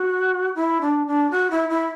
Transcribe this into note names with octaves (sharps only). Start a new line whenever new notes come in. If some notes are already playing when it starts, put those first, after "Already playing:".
Already playing: F#4
E4
D4
D4
F#4
E4
E4